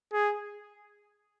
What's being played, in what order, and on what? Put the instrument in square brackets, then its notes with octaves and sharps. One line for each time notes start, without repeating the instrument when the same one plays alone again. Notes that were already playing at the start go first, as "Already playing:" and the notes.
[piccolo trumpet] G#4